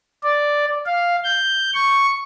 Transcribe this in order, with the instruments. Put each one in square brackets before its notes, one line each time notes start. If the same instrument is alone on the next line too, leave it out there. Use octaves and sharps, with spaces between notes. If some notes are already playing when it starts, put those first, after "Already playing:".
[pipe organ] D5
F5
G6
C#6